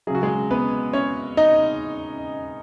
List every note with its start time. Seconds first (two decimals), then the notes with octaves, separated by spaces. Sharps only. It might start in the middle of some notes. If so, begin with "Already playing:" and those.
0.07 C#3 F#3 G#4
0.15 F#4
0.23 G#3 G#4
0.51 B3 B4
0.93 C#4 C#5
1.37 D#4 D#5